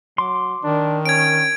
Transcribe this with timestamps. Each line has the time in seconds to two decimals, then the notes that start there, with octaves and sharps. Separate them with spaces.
0.18 F#3 C6 D6
0.63 D#3 D4
1.06 C#4 G#6 D7